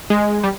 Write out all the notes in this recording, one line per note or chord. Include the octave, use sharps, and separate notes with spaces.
G#3
G3